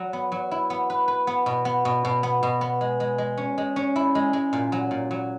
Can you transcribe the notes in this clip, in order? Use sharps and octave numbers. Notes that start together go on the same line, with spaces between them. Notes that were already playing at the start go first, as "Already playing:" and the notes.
Already playing: F#3
B3
F#3
E4
B3
B4
B4
B3
B2
B3
B2
B2
B3
B2
B3
G#3
G#3
G#3
C#4
G#3
C#4
E4
G#3
G#3
A#2
F#3
A#2
F#3